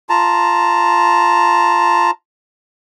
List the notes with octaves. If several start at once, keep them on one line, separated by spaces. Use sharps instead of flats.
F4 A5 A#5